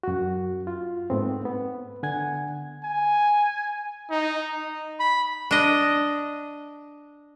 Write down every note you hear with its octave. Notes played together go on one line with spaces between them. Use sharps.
F#2 F#4
F4
G#2 A3 B3 C4
B3
D3 F#5 G#5 G#6
G#5
D#4
B5
D4 D#5